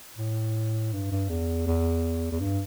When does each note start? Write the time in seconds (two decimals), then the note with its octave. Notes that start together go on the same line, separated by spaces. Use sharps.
0.18 A2
0.93 G2
1.12 G2
1.29 E2
1.67 E2
2.32 E2
2.40 G2